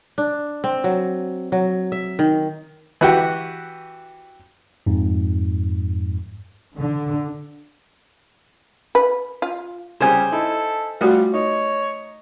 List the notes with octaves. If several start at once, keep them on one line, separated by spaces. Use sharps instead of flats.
D4
C4
F#3
F#3
E5
D#3
E3 F#4 G4
F2 G#2
D3
B4
F4
C#3 G3 G4 C5 G#5
D#4 E4 A4
G3 A3 F4 F#4 F#5
D#4 C#5